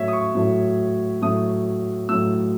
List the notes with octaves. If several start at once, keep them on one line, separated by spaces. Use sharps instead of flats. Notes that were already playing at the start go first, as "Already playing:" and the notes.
Already playing: A2 F#3 A3 C#5 E5
D#6
C#6
A2 F#3 A3
A2 F#3 A3 D#6
A2 F#3 A3 E6